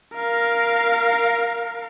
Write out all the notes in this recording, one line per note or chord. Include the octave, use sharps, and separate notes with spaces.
A#4 F5